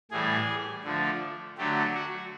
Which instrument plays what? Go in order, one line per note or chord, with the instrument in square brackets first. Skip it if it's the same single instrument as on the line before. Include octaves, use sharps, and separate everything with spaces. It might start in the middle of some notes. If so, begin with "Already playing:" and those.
[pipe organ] A2 E3 G3 G#4
D3 F3 A3
D3 F#3 A3 G4
F#4